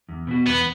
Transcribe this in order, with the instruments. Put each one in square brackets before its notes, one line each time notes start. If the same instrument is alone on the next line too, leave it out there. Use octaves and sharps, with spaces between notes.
[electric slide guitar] E2
B2 B3 F#4
[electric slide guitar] E2 [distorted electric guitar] B3